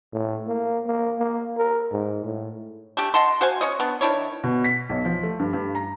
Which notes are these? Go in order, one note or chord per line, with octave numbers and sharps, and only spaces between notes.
A2
A#3
A#3
A#3
A#4
G#2
A2
A3 D4 G4
D#5 F#5 A5 C6
F#4 C5 F5 G#5
C#4 C#5 D#5
B3 D4
D#3 D4 E4 C#5
B2
B6
B1
F3
A3
G2
G2
A#5